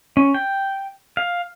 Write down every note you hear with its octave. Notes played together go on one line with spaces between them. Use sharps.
C#4
G5
F5